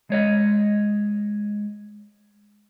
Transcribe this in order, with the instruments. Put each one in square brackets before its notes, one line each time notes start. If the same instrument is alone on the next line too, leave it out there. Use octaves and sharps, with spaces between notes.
[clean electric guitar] G#3 C#5 D#5